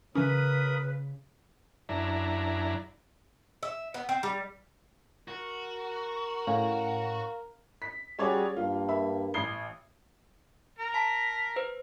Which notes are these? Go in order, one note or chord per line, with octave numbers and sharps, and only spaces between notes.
C#3 E3 C#4 A#4 B4 B5 D#6
F#2 D4 E4 A#5
E5
B3
C4
G3
F#4 A#4
A2 C#4 F5
B6
G3 C#4 F#4 G#4 C#5 D5
G2 A#3 F4
E5 B5
A1 C7 G7
A#4 A#5
A5 B5 B6
B4 C5